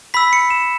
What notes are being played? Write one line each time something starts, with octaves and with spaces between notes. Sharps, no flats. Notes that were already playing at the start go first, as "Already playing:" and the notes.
B5 E6 B6
C#7
E7